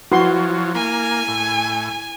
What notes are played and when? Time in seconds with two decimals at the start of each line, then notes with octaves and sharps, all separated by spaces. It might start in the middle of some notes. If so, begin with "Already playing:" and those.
0.12 F3 F#3 E4 F#4 B4 C6
0.75 A#3 G#5
1.28 A2